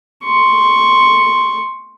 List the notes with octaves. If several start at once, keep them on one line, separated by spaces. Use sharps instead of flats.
C6 C#6